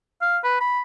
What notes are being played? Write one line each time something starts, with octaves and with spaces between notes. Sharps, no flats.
F5
B4
B5